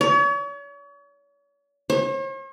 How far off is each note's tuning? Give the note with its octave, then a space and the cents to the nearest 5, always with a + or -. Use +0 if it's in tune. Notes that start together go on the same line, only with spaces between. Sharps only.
C#5 +40
C#5 -45